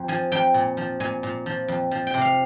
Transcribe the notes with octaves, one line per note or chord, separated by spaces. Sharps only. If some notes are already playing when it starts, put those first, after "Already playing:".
Already playing: F2
F3 G#5
F2 G5
A#2
F3
A#2 G#5
A#2
F3
F2
F3
G5
C3
F5